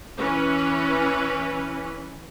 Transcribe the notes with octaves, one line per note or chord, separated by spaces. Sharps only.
E3 C#4 B4